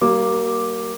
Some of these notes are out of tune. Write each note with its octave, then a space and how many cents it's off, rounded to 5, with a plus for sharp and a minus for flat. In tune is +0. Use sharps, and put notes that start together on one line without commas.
G3 -40 A#3 +0 D6 +0